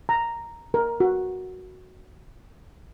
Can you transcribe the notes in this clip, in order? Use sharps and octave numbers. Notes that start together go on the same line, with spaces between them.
A#5
A#4
F#4